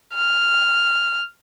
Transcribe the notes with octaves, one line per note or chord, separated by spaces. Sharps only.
F6